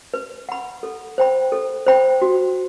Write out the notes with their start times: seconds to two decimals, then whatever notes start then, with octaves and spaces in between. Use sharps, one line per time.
0.14 B4
0.49 F#5 B5
0.83 A4
1.18 C5 G5 B5
1.52 A4
1.86 C5 G5 B5
2.22 F#4